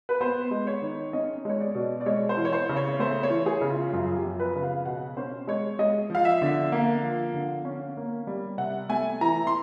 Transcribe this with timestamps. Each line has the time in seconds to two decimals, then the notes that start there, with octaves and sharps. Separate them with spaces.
0.09 B4
0.21 B3 C5
0.51 G#3
0.67 C#5
0.82 D#3
1.13 C#4 D#5
1.45 G#3 C#5
1.61 D5
1.75 B2
2.01 D5
2.06 G#3 C#5
2.29 C5
2.37 E3
2.45 C#5
2.53 C5
2.69 C#3
2.76 C#5
2.99 A3 C5
3.23 C#5
3.30 E3
3.46 G#4
3.61 C#3
3.70 F4
3.93 F#2 F4
4.16 G4
4.24 F3
4.40 B4
4.55 C#3
4.63 F5
4.85 B2 F#5
5.17 C#4 C5
5.47 G#3 C#5
5.79 G#3 D#5
6.10 F3 F5
6.25 E5
6.42 D3
6.72 A#3 F5
7.03 F3
7.34 D3
7.65 C#4
7.97 A#3
8.27 G3
8.58 C3 F#5
8.89 A3 G#5
9.21 E3 A#5
9.47 C6